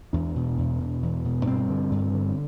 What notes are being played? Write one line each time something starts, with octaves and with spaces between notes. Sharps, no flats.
E2 D4
B2
E2
B2
E2
B2
G2 C4
D3
G2
D3